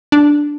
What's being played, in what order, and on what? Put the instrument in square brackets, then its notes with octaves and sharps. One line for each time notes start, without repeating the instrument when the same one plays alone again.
[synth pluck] D4